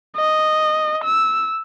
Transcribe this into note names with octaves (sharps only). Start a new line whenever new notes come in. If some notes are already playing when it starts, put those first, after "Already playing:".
D#5
E6